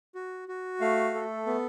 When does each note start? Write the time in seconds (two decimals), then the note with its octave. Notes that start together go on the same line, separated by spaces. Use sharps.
0.15 F#4
0.48 F#4
0.81 A3 F5
1.15 A4
1.47 B3